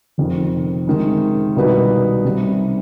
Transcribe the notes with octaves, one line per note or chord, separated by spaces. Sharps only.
F1 F2 D#3
C3 D#3 G#3
C2 B2 B3 D#4 B4
C3 D#3 G3